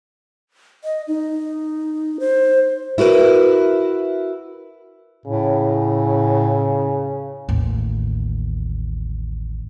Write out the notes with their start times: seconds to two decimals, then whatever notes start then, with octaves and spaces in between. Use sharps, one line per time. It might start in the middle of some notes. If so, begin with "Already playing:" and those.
0.84 D#5
1.08 D#4
2.20 C5
2.98 E4 F#4 A#4 B4
5.26 A2 C#3
7.49 A1 D#2